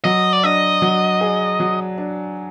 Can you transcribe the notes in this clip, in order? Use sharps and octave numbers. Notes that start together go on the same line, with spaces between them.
F#3 D#5
D5
D4 D#5
F#3
G#4
F#3
D4